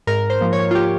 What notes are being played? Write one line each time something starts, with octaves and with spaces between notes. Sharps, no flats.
G#2 A#4
C5
F3 A#3
C#5
F4
G4